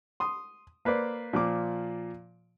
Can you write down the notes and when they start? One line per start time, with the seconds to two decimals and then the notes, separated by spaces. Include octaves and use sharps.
0.20 C6 D#6
0.85 A#3 B4 C5 D5
1.33 A#2 F3 D6